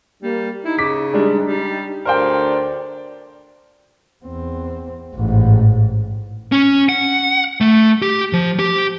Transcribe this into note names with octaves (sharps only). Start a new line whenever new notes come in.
G3 A#3
D#4 E4
C#3 D6 B6
G3 G#3 D4
G3 D4
D2 A#4 C5 D5 G5
E2 C4
A1 G#2
C#4
F#5
A3
G4
F3
G4